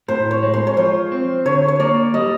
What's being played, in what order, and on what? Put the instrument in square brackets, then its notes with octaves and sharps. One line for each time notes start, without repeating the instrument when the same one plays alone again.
[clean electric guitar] A2 [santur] C5
[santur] C#5
[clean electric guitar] G#3
[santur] C5
C#5
[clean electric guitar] F3 [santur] C5
[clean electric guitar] C4
[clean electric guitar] D3 [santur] C#5
[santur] C#5
[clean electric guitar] A#3 [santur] D5
[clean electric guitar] G3 [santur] D#5